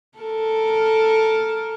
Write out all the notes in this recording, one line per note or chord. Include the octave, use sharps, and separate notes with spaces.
A4 A#4